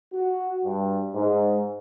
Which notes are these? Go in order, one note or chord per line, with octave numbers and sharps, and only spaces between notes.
F#4
G2
G#2